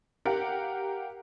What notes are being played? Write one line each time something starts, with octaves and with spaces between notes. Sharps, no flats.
G4 A#4 F5 F#5